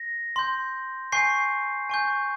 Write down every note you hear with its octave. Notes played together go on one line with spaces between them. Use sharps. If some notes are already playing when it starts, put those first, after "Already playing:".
Already playing: A#6
C6 G6
G#5 C#6 G6 C7
G#5 C#6 G6